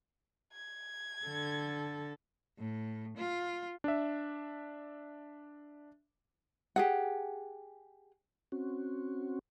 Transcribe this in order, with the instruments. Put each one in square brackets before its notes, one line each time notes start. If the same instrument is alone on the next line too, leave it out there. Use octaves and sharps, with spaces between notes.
[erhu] G#6
[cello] D3 A4
A2
F4
[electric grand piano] D4 E5
[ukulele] G4 G#4 F#5
[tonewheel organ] C4 C#4 F#4